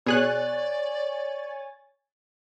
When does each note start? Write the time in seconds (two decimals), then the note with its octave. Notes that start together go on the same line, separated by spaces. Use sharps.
0.06 B2 G#4 C#5 D5 G#5 F#6 A6